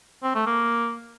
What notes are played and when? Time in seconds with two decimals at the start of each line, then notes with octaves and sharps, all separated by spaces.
0.23 C4
0.35 A3
0.47 A#3